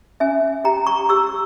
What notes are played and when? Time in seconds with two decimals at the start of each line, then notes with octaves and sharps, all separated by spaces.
0.20 C#4 E5 G#5
0.64 G4 G5 A#5
0.87 A#5 C#6
1.09 G4 C#6 E6